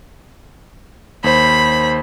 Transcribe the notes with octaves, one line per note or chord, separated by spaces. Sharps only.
D#2 C5 B5